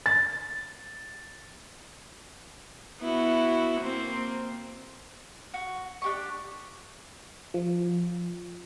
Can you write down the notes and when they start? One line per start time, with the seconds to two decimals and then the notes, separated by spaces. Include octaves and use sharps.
0.06 A6
3.01 B3 E4 F#4
3.81 A#3 C4
5.54 F#4
6.02 D4 G4 C#6
7.54 F3